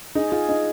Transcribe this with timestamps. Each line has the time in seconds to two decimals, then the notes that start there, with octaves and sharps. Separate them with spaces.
0.15 D#4 G#4
0.32 F4 G#4
0.49 D#4 D#5